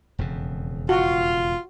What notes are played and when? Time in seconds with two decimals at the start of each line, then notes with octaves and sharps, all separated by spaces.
0.19 E1 F2 C#3
0.89 F4 F#4